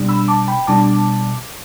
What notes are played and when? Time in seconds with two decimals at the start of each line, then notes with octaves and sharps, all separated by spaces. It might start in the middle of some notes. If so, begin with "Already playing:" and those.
Already playing: B2 G3 D4
0.09 B5 E6
0.28 A5 D6
0.48 G5 B5
0.67 B2 G3 D4 A5 D6